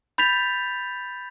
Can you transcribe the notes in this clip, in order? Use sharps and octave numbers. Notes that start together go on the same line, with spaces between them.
B5 G6 A6 B6 F7